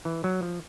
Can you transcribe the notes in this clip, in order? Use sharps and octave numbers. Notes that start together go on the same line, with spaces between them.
E3
F#3
F3